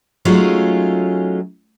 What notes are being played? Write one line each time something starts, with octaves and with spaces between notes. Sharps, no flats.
F#3 G#3 A3 C#4 D#4 F4